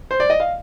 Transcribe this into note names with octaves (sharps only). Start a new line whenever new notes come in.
C5
D5
D#5
F5